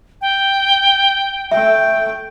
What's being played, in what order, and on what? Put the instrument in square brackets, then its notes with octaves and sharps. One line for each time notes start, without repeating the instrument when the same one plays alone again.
[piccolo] G5
[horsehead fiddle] A3 G5 [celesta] E5